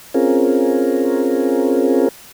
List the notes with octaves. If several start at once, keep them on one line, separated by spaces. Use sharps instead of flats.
C4 C#4 F4 G#4 A#4